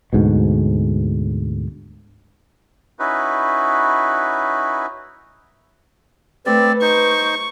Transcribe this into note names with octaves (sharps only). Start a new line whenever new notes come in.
D2 G#2 B2
C#4 D#4 E4 F#4 B4
A3 C4 B4 D5
D#4 C5 C#6